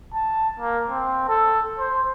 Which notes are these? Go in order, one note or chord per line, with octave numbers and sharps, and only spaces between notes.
A5
A#3
C4
A4
C5